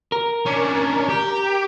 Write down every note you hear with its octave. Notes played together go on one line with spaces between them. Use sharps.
A#4
C#4 D4
G4